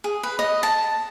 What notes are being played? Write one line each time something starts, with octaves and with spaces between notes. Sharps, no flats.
G#4
B4
D#5
A5